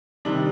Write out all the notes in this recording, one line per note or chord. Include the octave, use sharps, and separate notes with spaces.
C3 D#3 G3 D4